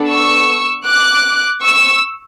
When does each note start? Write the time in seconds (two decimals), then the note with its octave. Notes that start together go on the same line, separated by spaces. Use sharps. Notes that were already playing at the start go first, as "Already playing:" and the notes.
Already playing: B3 D4 A4
0.09 C#6 E6
0.87 D6 F#6
1.61 C#6 E6